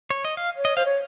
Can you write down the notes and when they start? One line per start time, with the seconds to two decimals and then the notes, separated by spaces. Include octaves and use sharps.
0.10 C#5
0.25 D#5
0.37 F5
0.56 C#5
0.65 D#5
0.76 C5 F5
0.85 C#5